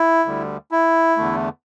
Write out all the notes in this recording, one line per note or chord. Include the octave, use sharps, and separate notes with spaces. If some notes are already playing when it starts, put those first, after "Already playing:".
Already playing: E4
D2 D3 G3
E4
E2 D3 A3